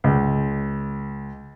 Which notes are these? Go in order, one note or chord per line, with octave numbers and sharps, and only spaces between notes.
C#2